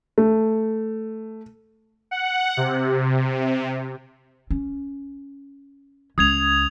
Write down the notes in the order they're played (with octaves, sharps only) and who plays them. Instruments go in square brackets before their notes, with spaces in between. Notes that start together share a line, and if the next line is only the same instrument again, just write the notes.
[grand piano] A3
[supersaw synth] F#5
C3
[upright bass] C#4
[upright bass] C#2 [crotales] D#6 G#6 F7